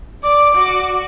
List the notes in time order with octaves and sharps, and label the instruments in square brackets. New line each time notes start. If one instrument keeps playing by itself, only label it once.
[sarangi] D5 [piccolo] D6
[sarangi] F#4